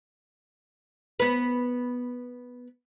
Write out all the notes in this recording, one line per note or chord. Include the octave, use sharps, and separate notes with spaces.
B3 B4